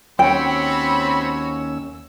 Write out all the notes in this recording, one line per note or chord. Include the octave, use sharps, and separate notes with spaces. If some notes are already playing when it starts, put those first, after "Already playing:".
D#2 C4 C#4 F#4 C#5 G5 B5 E6